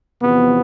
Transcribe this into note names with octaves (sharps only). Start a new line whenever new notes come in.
E2 C3 F3 B3